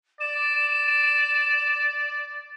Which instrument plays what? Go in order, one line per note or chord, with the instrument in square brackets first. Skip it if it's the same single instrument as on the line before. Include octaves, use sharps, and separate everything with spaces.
[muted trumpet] D5 [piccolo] E7